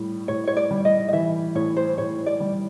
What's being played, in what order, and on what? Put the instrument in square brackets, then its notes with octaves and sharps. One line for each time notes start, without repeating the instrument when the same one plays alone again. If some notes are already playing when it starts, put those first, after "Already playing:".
Already playing: [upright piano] A2 G3
[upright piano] A2 [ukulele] C#5
[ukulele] C#5
D5
[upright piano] G3
[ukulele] D#5
D#5
[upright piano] E3 [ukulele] E5
[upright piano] A2 [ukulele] C#5
[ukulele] C5
[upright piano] A2 [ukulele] C#5
[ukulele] D5
[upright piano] G3